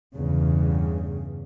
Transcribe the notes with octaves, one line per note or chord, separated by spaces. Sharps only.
E2 G2 C#3